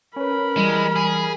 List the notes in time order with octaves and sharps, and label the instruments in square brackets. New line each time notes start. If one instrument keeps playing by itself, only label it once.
[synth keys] C#4 B4 [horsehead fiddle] A#4 B5
[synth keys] E3 G3 [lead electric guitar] G#3
[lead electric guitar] G#4